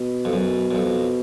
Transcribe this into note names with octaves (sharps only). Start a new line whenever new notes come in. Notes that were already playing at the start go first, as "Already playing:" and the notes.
Already playing: B2
F2
F#2
F#2
F2